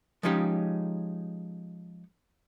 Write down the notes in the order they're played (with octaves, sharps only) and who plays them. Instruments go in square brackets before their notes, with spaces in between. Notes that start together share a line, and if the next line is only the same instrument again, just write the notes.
[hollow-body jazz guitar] F3 G#3 C#4 D#4 G4